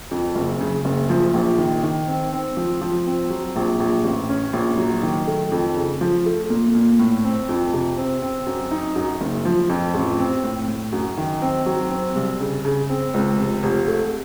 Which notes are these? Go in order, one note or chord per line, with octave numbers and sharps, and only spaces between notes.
F2
F#1
C#3
F#1
F3
A#1
D#3
D#3
C4
C4
F3
F3
C4
F#3
A#1
A#1
A1
C#4
A#1
F#3
D#3
A3
F2
C#3
F3
A3
A#2
A#2
A2
C4
F2
C3
C4
C4
F#2
D#4
F#2
F#1
F3
F2
A1
C4
A2
A2
F#2
D#3
C4
F#3
C4
C2
C#3
C#3
C4
C#2
F1
F1
A3